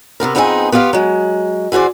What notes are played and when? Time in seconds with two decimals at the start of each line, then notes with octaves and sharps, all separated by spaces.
0.20 C3 D#3 B3 A#4
0.35 F2 B3 C4 D#4 F4 G#4
0.72 B3 F4 G4 D#5 F5
0.93 F#3 G#3
1.72 E3 F#4 G#4 C5 D5